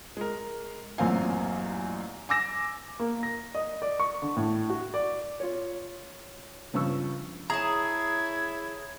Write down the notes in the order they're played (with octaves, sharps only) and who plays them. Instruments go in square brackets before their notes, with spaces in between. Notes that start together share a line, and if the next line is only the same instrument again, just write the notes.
[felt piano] G#3 A#4
A1 F#2 A#2 C4 F5 G#5
G#5 D6 E6 A#6 E7
[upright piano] A#3
A#6
D#5
D5
C#6
D3
A2
F#4
D5
[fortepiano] F4 C#5
C#2 G2 C#3 F3 C#6 E6
[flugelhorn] E4 [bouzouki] G#4 A5 [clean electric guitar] C#5 A#5 [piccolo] G#6